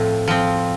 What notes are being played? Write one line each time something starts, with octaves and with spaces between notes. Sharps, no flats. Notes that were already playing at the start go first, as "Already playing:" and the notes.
Already playing: A2 F3 C4
F3 C4